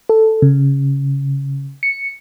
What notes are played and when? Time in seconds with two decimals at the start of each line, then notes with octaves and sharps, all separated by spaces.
0.09 A4
0.42 C#3
1.83 C#7